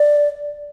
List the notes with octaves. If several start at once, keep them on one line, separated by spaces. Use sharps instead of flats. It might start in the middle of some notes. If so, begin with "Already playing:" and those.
Already playing: D5